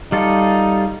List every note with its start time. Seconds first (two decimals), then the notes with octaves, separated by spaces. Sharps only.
0.12 G3 D#4 F4 A4